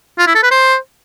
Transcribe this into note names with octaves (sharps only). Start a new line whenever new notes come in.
F4
E4
A4
B4
C5